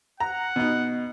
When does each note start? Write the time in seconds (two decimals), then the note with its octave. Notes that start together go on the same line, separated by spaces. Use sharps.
0.20 F#5 A#5
0.56 B2 D#4